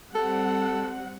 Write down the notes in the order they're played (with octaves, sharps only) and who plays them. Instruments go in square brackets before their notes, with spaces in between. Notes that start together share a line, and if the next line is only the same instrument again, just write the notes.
[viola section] G3 C4 F#5 [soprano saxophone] A4